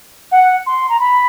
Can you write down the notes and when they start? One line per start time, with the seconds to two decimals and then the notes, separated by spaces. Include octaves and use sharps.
0.31 F#5
0.66 C6
0.89 A#5
0.99 B5